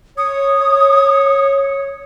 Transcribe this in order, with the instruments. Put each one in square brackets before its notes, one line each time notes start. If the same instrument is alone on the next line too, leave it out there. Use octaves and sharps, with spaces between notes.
[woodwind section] C#5 [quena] D#6